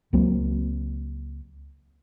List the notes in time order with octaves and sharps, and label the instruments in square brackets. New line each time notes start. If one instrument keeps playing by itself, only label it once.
[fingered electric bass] C#2 F#3 A#3 C4